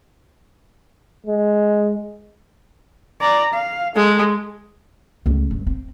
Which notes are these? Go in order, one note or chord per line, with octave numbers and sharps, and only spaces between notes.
G#3
D5 A#5
F5
G#3 A4
C#2 A3
G2
C4